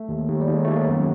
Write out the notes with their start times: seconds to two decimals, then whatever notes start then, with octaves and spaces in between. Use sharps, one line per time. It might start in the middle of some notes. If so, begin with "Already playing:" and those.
Already playing: A3
0.09 D#2
0.29 D#2
0.41 G3
0.48 D#2 G#3
0.65 D#2 A3
0.76 A#3
0.87 F#2 B3